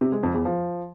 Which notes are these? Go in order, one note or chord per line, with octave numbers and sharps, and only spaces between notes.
C3
G#3
F2
E2
F3